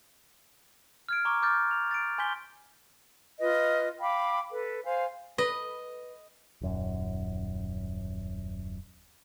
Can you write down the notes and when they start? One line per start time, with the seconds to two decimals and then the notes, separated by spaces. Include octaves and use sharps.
1.09 F6 G#6 D7
1.25 A#5 C#6 D6
1.42 D6 F6 G6 A6
1.71 F7
1.91 A6 D7
2.18 G#5 C6 G6 B6 G7
3.39 F4 B4 D#5
4.00 F5 G5 B5 D6
4.51 A4 B4
4.84 C5 F5 G#5
5.38 B4 D#5
6.61 D#1 F#2